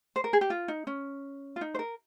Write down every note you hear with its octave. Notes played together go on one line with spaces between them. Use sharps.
C5
A#4
G#4
G4
F4
D#4
C#4
F4
D#4
C5
A#4